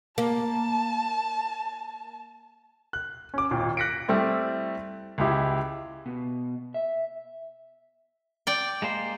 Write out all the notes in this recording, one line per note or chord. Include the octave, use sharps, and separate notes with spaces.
A#3 A5
F#6
C#4 D6
G#1 D#2 A#2
F#6 A#6 B6 C#7 D7
G3 A3 C4 E4
C#2 G#3 E4 G4
B2
E5
D5 G5
G#3 A#3 C5